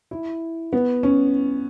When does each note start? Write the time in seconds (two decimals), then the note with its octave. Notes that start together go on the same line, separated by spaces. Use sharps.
0.11 E4
0.73 B3
1.03 C#4